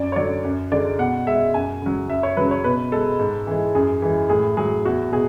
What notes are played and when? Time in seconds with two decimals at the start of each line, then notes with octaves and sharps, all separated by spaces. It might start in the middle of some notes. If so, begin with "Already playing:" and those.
Already playing: F#2 D5
0.12 C#5
0.16 D3 F#3 D5
0.44 F#2
0.72 D3 G#3 D5
0.99 B2 F#5
1.26 G#3 E5
1.54 F#2 G#5
1.82 C#3 F#3
2.09 F#2 E5
2.23 C#5
2.37 C#3 F#3 B4
2.51 C#5
2.64 B2 B4
2.92 G#3 A4
3.19 G#2
3.47 E3 G#3
3.75 F#2 G#4
4.02 E3 G#3
4.30 A2 G#4
4.57 F#3 G#4
4.85 E2 F#4
5.12 B2 G#4